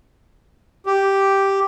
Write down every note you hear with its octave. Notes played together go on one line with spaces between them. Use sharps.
G4